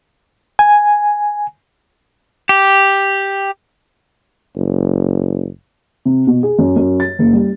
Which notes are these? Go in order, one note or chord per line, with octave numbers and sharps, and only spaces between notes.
G#5
G4
F#1
C3
B2
G#4
F#2
F#2
A6
F#1
G3